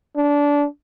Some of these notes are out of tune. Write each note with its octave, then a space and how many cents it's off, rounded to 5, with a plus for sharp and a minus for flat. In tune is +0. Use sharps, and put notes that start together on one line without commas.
D4 -20